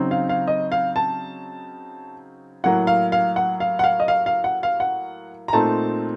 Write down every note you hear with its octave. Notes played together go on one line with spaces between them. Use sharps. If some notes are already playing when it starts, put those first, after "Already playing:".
Already playing: C#3 F#3 C4 D#4
F5
F5
D#5
F5
A5
A2 F#3 A#3 F#5
F5
F5
F#5
F5
F#5
F5
D#5
F5
F5
F#5
F5
F#5
A#5
A#2 A3 C4 D#4 A5